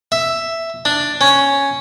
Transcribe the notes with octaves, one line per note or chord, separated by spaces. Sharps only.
E5
D4
C#4